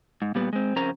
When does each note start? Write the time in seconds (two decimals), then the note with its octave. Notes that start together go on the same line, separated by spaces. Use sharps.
0.22 G#2
0.35 A#2 G3 B3
0.53 G#3 C4
0.76 F2 C#3 C#4 A#4 C5 A#5